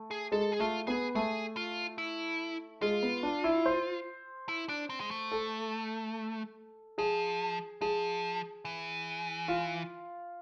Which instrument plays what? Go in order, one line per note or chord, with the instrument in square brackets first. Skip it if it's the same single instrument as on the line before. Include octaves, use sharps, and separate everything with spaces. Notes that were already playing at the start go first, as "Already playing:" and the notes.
Already playing: [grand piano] A3
[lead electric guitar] G#4
[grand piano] G#3 [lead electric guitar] A4
[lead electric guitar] G#4
[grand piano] A3 [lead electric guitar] F4
[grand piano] B3 [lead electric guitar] G#4
[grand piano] A3 [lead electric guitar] G#4
[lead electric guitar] F4
E4
[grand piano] G#3 [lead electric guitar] F4
[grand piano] B3
D4
E4
C5
[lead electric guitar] E4
D4
C4
G#3
A3
[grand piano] A4
[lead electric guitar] F3 [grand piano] G#4
[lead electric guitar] F3 [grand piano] G#4
[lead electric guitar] E3
[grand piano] F4